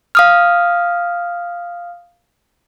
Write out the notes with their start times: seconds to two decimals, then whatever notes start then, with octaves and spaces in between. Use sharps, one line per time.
0.15 F5 D#6 F6